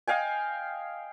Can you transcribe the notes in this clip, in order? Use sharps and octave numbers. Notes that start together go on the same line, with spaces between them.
D#5 F5 G5 G#5